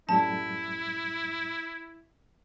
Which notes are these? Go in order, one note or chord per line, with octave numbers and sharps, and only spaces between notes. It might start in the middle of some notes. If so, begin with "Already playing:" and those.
F#2 A2 G3 E4 A5